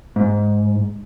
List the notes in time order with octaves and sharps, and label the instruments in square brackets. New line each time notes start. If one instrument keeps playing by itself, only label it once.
[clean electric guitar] G#2